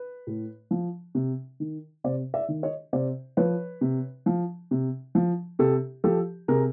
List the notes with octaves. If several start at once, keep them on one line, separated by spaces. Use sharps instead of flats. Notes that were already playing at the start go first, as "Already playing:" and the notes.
Already playing: B4
A2
F3
C3
D#3
C3 C5 D5
D5 E5
D#3
C#5 D#5
C3 C5 D5
F3 B4 C#5
C3
F3
C3
F3
C3 G4 A4
F3 G4 A4
C3 G#4 A#4